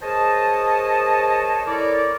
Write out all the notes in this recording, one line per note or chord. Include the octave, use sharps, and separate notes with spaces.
G#4 A#4 C5 C#5 D#5 A5
E4 A4 A#4 C#5 D5